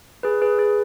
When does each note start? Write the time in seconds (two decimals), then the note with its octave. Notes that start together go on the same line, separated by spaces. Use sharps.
0.23 G#4 B4
0.42 G#4 B4
0.58 G#4 B4